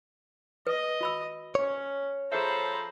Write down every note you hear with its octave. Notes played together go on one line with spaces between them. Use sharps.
B4 D#5
F#4 B5 E6
C#4 C#5
F3 G#4 A4 C5 E5 A#5 B5